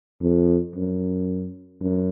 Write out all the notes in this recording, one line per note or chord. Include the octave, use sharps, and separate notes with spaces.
F2
F#2
F#2